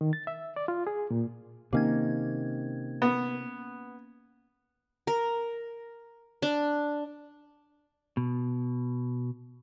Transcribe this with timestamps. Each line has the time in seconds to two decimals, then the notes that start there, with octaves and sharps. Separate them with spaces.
0.01 D#3
0.13 A6
0.27 E5
0.56 D5
0.68 F4
0.87 G#4
1.11 A#2
1.73 C3 D#3 A#3 C#4 G#6
3.02 B3
5.07 A#4
6.42 D4
8.17 B2